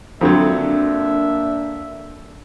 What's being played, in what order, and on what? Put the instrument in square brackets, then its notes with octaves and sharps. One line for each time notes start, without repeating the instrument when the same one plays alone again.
[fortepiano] F2 D3 F#3 [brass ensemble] A#3 D4 E5